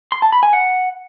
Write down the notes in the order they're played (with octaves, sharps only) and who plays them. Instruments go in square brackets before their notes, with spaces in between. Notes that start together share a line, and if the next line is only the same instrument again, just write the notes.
[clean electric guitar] C6
A5
B5
G#5
F#5